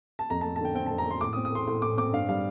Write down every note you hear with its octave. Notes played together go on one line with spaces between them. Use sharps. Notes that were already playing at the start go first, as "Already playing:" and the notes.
A5
F2 A#5
A5
A3
A5
D3 G5
C4 G5
A5
F2
A#5
A3 C6
A2 D6
D#6
C4
D#6
A3 C6
A2 C6
A2 D6
C4 D6
G2 F5
G3 F5